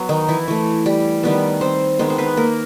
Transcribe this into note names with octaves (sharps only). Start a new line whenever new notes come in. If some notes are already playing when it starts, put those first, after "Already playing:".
Already playing: F#3 B3
D#3 D#4
E3 E4
E3 A3
G3 G4
D#3 G3 B3
C4 C5
D#3 G#3 B3 C4 C5
C5
B3 B4
A#3 A#4